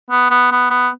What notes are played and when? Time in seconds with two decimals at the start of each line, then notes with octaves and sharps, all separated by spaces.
0.11 B3
0.31 B3
0.51 B3
0.70 B3